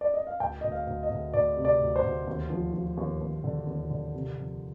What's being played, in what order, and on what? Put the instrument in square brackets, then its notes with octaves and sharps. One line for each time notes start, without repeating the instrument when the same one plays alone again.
[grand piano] D5
D#5
F5
D2 G5
D2 D#5
F5
D2
D#5
D2
D2 D5
C3
D5
D2
C5
D2
D#2
F3
F3
D#2
D#2
D3
D#2
D3
C3
F2